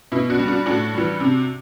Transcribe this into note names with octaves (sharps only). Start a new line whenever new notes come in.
B2 E4
D4 F#4
G3
D4 F#4
A2 D4 F#4
E3 G3
C3